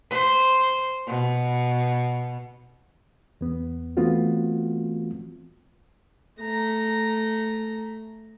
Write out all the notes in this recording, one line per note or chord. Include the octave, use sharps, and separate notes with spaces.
C5
B2
E2 B3
E3 A3 B3 C4 F4 F#4
A3 A#5